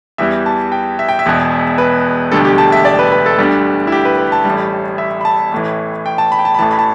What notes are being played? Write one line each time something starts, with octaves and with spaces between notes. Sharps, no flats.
E2 E3 G3 E5
A5
G5
E5
G5
E5
E1 E2 B2
B4
E1 D2 D3 G3 A4
G4
A5
E5
D5
B4
B4
A4
D2 D3 G3
E4
G4
B4
B4
A5
A1 A2 G3
E5
B5
A5
A1 A2 E3
G5
A5
B5
G5
A5
B5
A1 A2 E3 A5
B5
A5